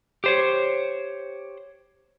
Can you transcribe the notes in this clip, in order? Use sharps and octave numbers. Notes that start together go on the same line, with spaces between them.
G4 C5 C#5